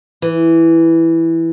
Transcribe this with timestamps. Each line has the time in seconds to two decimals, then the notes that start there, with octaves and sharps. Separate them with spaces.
0.22 E3